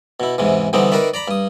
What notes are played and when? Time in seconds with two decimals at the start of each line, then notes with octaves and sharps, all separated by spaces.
0.20 B2 E4
0.38 E2 G#2 C3 E3
0.73 D3 E3 G3 B3 C4 D#4
0.92 D#3 A#4 B4 D5 E5
1.14 D5 A#5 B5
1.28 G2 D#6